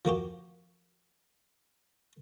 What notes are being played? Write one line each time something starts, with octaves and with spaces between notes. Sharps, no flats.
F3 A#3 F#4 G4